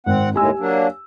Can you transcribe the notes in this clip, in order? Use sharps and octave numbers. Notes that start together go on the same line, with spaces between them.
G#1 C4 F#5
D#2 A2 G#3 G4 G#5 E6
F#3 A#3 D4